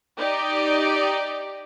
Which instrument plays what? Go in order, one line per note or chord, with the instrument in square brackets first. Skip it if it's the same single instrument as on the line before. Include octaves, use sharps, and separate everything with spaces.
[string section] D#4 G4 D5